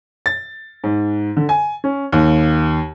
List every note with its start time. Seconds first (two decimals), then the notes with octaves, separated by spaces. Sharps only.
0.26 A6
0.84 G#2
1.37 D3
1.49 G#5
1.84 C#4
2.12 D#2